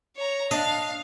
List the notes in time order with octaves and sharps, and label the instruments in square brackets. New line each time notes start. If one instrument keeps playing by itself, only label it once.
[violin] C#5 A#5
[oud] D4 [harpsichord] D#5 [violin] F5